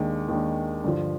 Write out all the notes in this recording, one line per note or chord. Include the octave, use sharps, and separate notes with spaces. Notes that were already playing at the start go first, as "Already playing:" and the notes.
Already playing: D#2 D#3 G#3 D4
D#2 D#3 G#3 D4
G2 D3 F3